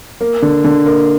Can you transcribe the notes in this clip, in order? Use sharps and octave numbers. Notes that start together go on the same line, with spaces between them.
A#3
D3
D3
A#3